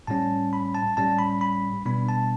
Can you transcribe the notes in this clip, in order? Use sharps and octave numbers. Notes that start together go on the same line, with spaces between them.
A2 G3 C#4 A5
B5
A5
A2 G3 C#4 A5
B5
B5
B2 G3 B3 D4 B5
A5